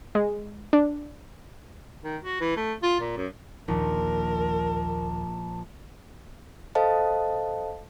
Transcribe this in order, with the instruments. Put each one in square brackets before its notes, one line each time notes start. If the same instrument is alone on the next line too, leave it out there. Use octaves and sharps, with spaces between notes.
[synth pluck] G#3
D4
[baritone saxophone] D#3
F#4
E3
A3
F4
A#2
F#2
[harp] A#1 [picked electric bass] D#2 D#3 [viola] A#4 [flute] A5
[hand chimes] A4 C5 D#5 F5 A5